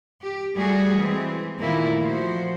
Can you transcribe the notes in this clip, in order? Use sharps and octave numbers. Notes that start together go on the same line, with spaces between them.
G4
G3 A3 F#4 G#4
E3 G#3 C4
A#2 D#3 A3 A#3 E4
F3 F#4 C5